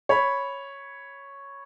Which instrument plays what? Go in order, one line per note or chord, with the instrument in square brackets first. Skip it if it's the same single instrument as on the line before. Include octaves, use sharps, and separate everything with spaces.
[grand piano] C#5 B5